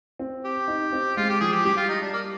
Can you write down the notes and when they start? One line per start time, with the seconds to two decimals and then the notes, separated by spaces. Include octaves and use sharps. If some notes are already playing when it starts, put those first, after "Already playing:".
0.19 C4
0.45 G4
0.68 D#4
0.92 C4
1.17 G#3 F4
1.29 G4
1.40 F3 G#4
1.52 G4
1.65 G3 G4
1.77 F4
1.89 D#4
2.01 D4
2.13 A#3